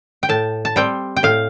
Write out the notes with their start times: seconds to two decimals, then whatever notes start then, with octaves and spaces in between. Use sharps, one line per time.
0.23 G5
0.29 A2 A5
0.65 A5
0.76 G3 C4 G5
1.16 G5
1.23 A2 F5